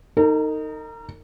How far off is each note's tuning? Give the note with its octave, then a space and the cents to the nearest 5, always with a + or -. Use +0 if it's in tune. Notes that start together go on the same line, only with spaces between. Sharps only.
D#4 +0 A#4 -45